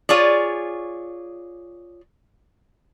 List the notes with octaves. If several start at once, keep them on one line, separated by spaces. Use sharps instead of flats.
F4 G#4 C#5 D5